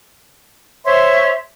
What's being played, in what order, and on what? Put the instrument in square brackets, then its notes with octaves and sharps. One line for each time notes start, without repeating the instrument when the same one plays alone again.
[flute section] C5 C#5 E5 C6